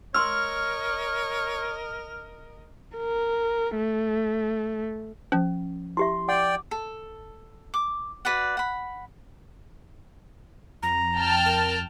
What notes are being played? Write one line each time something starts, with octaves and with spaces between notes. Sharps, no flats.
A#4 C#5 D#5 C6 E6 F6
A#4
A3
F3 C#4
E4 G4 E5 C6
D5 F#5 G5 D6
A4
D6
F#4 B4 D5 F#5
F#5 B5
F2 A#5
G5 A5 F6
A#4